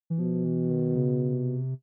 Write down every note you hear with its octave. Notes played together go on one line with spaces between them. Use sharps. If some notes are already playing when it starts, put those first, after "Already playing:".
E3
B2 F3
E3
D#3
C#3
C3